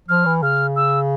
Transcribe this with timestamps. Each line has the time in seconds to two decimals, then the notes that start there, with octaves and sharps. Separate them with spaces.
0.08 F3 F6
0.26 E3
0.42 C#3 F6
0.76 E6